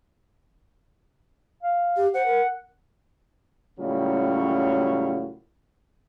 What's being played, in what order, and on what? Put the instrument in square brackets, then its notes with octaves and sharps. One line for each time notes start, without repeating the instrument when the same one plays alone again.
[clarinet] F5
[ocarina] G4
[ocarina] C5 [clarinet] F#5
[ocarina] A#4
[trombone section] C#2 A2 F#3 G3 A#3 C#4